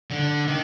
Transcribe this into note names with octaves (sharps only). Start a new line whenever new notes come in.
D3
D#3